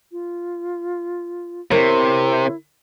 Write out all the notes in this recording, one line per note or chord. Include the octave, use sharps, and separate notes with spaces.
F4
C3 E4 A#4 C#5